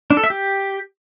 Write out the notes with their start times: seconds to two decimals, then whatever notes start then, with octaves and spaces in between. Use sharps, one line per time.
0.10 D4
0.17 A4
0.24 E5
0.30 G4